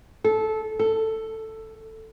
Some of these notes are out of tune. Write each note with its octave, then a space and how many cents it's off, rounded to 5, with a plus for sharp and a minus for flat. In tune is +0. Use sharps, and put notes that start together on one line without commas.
A4 -15
A4 +10